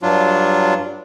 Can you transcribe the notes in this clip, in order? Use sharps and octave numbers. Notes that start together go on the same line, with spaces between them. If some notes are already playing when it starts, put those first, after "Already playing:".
G2 F#3 D4 F4